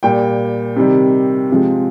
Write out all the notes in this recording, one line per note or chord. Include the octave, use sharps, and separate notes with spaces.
A#2 G3 G5
C3 D#3 G3
C3 F3 G#3